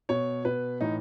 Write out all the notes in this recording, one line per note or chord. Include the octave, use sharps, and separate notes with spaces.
B2 C#5
B2 B4
A2 E3 D#4